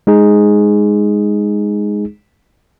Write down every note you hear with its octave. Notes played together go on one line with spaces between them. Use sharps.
G#3 D#4 G#4